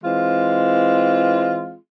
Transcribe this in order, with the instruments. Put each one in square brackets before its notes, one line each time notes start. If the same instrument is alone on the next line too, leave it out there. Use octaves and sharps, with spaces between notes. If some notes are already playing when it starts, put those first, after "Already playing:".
[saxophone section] E3 G#3 C4 F4